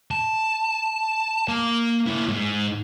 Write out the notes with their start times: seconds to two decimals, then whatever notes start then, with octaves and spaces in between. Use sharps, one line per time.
0.11 A5
1.48 A#3 A#4
2.07 A#3 E4
2.28 G#2